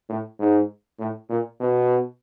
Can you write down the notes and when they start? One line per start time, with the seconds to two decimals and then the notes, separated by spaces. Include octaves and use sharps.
0.09 A2
0.39 G#2
0.99 A2
1.30 A#2
1.60 B2